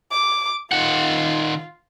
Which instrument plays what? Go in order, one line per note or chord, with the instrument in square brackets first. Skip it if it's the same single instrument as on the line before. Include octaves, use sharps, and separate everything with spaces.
[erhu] D6
[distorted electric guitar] D#3 F#5 [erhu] F4